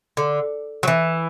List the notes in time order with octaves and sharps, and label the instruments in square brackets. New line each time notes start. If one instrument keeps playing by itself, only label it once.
[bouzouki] D3
F#3
E3